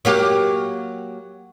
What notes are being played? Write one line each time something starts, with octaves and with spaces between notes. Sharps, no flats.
F#3 A#3 G4